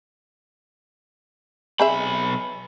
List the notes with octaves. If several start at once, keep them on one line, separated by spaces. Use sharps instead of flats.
B1 C4 G#4 E5 B5